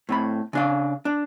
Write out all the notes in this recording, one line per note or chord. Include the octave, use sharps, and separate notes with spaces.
A2 C4 B5
C#3 D4 F5
D4